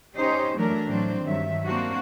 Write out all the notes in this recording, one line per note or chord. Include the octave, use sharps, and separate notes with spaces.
C#4 D#4 G4 C5
E3 F#3 A3 D4 A#4
A2 F#3 C4 D4
G2 D#3 F#3 E5
A#3 C4 D4 F#4